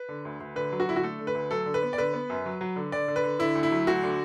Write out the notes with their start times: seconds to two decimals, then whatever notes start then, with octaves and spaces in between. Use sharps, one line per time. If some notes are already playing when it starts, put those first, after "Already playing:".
Already playing: B4
0.09 D3
0.25 D2
0.40 D2
0.55 D3 B4
0.72 F#3
0.80 F#4
0.87 D3 E4
0.96 F#4
1.03 A3 A4
1.19 D3
1.27 B4
1.35 D2
1.51 F#3 A4
1.66 D3
1.74 B4
1.82 B3
1.93 D5
1.98 D3 B4
2.14 B3
2.30 F#2
2.46 F#3
2.61 F#3
2.76 D3
2.92 D3 D5
3.08 D3
3.16 B4
3.23 D3
3.39 D3 E4
3.55 D2
3.63 E4
3.71 F#3
3.87 D2 F#4
4.03 D3